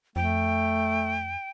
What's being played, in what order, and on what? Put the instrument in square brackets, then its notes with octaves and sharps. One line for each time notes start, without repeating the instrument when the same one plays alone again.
[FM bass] F2 [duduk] A3 [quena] G5